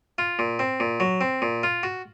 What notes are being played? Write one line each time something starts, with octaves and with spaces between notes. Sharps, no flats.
F4
A#2
C4
A#2
F#3
C4
A#2
F4
F#4